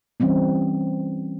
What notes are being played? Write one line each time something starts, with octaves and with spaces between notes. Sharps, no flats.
E3 G3 C4 C#4